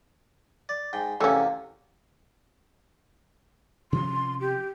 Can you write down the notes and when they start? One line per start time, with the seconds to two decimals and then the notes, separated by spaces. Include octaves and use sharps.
0.69 D5
0.93 G#2 G5
1.20 E2 C3 A3 A#3 C#4
3.92 C3 F3 C#4 C6
4.41 G4